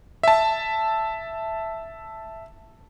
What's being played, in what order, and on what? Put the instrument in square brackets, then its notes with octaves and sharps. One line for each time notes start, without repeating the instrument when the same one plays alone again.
[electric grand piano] E5 A5